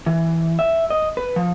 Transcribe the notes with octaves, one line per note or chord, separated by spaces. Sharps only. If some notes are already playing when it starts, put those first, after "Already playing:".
E3
E5
D#5
B4
F3